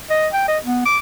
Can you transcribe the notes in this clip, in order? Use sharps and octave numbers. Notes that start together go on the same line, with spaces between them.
D#5
G5
D#5
B3
D6